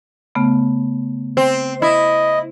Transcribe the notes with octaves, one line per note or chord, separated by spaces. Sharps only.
C#3 A3 B3
C4
E4 D#5